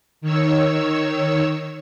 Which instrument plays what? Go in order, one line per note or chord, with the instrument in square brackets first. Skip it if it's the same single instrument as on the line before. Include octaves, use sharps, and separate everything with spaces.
[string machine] D#3 C#5 E6